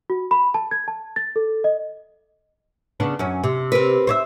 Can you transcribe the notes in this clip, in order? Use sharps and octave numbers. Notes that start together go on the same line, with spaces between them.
F#4
B5
A5
G#6
A5
A6
A4
D#5
C#3 B3 D4
F#2 C#4
C3
C4 A#4 B4
C5 C#5 E5